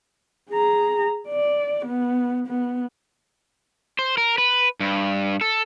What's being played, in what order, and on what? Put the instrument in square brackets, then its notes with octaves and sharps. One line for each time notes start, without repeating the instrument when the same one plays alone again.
[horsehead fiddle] G#4 A#5
D5
B3
B3
[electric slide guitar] C5
A#4
B4
G2
A4